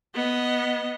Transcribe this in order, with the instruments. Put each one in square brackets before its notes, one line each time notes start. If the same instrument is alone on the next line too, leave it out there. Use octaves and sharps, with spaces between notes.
[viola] B3 D#5